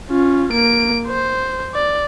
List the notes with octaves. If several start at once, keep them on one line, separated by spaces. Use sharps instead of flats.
C#4 F4
A#3 D7
C5
D5